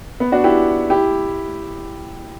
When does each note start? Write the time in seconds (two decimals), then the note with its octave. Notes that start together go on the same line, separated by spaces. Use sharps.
0.20 B3
0.32 D4 F#4
0.44 E4 G4
0.90 E4 G4